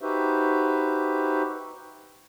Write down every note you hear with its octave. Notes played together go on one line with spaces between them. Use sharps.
D#4 F#4 G4 B4 C5 E5